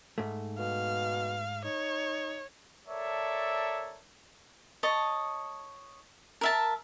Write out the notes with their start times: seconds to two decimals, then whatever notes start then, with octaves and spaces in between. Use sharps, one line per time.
0.18 G#2 A3
0.59 B2 F5
1.64 D#4 C#5
2.88 A4 A#4 C#5 D5 E5 A5
4.83 C#5 D#5 A5
6.41 A#4 E5 A5